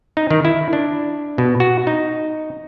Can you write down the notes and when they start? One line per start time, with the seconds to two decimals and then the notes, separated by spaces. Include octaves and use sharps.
0.17 D#4
0.30 D#3
0.45 E4
0.73 D4
1.38 B2
1.60 F#4
1.87 D#4